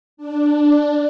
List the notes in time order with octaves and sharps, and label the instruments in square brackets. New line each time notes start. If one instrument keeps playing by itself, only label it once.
[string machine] D4